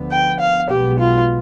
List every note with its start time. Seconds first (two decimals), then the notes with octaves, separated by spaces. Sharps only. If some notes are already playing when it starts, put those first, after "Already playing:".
Already playing: D2 D3 F3 B3
0.10 G5
0.39 F5
0.70 B1 B2 G#3 B3 G4
0.99 F4